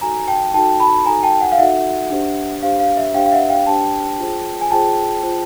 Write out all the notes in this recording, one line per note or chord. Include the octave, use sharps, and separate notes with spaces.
D#4 F#4 A4 G#5 A#5
G5 A5
D#4 F#4 A4 G5 A5
A5 B5
D#4 F#4 A4 G#5 A#5
G5 A5
F#5 G#5
F5
D#4 F#4 A4 E5 F#5
D4 G4 C5
D4 G4 C5 F5
F5
E5
D4 G4 C5 F5 G5
F5
E5 F#5
F5 G5
D4 G4 C5 G5 A5
F4 G#4 C5
G#5
F4 G#4 C5 G5 A5
F4 G#4 C5